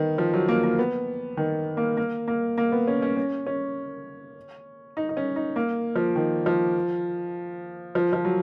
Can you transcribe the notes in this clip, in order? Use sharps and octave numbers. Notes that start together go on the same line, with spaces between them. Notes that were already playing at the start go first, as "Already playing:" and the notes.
Already playing: D#3 B3
F3
F#3
A#3
A#3
B3
D#3
A#3
A#3
A#3
A#3
B3
C#4
C#4
C#4
C#4
D#4
D#4
C#4
D#4
A#3
F3
D#3
F3
F3
F3
F#3